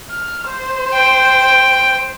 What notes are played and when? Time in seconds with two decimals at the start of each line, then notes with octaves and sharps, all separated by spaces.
0.11 F6
0.49 C5
0.93 G5